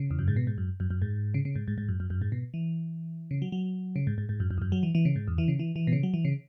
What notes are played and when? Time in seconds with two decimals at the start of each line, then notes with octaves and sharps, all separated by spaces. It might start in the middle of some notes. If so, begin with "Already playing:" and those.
Already playing: C#3
0.11 E2
0.19 F#2
0.28 G#2
0.36 B2
0.47 G#2
0.58 F#2
0.80 F#2
0.90 F#2
1.02 G#2
1.34 C#3
1.45 C#3
1.55 G#2
1.68 G#2
1.78 G#2
1.89 F#2
2.00 F#2
2.10 F#2
2.22 G#2
2.32 B2
2.54 E3
3.31 C#3
3.42 F#3
3.52 F#3
3.96 C#3
4.07 G#2
4.18 G#2
4.29 G#2
4.40 F#2
4.51 F#2
4.58 E2
4.62 F#2
4.72 F#3
4.83 E3
4.95 E3
5.05 C#3
5.16 G#2
5.28 E2
5.38 E3
5.48 C#3
5.59 E3
5.76 E3
5.87 B2
5.93 C#3
6.03 F#3
6.14 E3
6.25 C#3